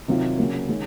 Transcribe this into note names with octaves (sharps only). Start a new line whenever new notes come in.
C3 D#3 F#3 C4 F4
C#3 F#3 A#3
D#3 G#3 C#4